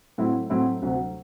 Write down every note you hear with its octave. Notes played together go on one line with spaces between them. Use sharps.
A2 F#3 C4 E4
A2 F#3 C4 E4
D2 C3 F#3